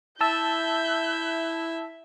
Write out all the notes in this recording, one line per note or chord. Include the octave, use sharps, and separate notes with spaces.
E4 E5 A5 E6 G6